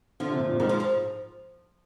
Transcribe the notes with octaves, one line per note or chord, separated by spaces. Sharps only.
D3 F3
C3
A#2
A#2
G#2 D#3
F3
F3